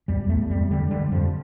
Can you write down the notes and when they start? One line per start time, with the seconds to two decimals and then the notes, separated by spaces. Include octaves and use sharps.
0.08 E2 G3
0.29 E2 A3
0.50 F2 G3
0.71 D3 G3
0.91 D3 G3
1.12 F2 F3